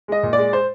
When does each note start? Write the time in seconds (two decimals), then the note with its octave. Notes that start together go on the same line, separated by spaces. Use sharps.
0.08 G#3 D#5
0.23 A#2
0.33 D5
0.38 G#3
0.53 C5